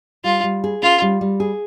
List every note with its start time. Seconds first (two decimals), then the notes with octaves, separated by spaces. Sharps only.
0.24 G3 F4
0.44 G3
0.64 G#4
0.82 C#4 F4
1.02 G3
1.21 G3
1.40 G#4